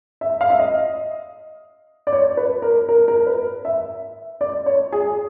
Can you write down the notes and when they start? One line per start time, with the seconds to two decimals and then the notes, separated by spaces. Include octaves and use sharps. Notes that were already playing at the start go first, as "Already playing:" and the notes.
0.21 E5
0.41 F5
0.50 E5
0.59 D#5
2.07 D5
2.13 C#5
2.37 B4
2.62 A#4
2.89 A#4
3.08 A#4
3.27 B4
3.65 E5
4.41 D5
4.66 C#5
4.92 G#4